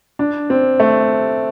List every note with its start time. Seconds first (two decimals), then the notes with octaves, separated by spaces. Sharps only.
0.19 D4
0.50 C4
0.80 A3